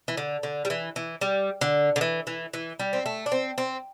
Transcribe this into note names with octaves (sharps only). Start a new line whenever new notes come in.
E3
D3
D3
G3
E3
E3
G3
D3
D3
E3
E3
E3
G3
C4
A3
D4
C4
C4